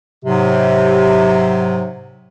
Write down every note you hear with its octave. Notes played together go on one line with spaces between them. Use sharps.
G#2 C3 F#3